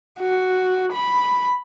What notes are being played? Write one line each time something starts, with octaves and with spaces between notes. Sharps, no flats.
F#4
B5